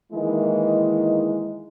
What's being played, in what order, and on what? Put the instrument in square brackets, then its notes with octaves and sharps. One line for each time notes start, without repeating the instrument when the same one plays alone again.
[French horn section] D#3 E3 G#3 A#3 D#4 E4